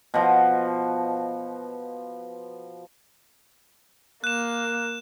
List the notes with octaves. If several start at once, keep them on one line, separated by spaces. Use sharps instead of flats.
B2 F3
A#3 F#6 E7